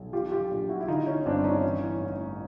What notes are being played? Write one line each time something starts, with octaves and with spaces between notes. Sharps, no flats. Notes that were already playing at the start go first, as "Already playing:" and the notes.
Already playing: B1
F3 F4 G4
F4 G4
A#1
E4 F#4
E4
D3 D#4 F4
C#4 D#4
G1 C4 D4
C#4 D#4
E3
A1